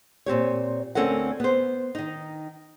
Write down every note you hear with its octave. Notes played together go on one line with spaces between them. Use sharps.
A#2 C4 G4 C#5
D2 C4 C#4 A4 A#4 F#5
B3 C5
D#3 D#4